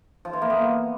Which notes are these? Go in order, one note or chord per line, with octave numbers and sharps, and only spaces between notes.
F3
E3
A#3
B3